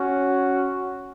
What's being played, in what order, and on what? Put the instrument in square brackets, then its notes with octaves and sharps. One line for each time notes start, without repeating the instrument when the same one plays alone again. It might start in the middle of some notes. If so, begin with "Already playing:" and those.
Already playing: [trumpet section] C#4 F#4